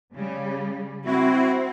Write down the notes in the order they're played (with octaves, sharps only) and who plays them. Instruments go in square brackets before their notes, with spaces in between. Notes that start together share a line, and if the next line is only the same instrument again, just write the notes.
[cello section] C#3 G3
[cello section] C4 [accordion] E4 F#4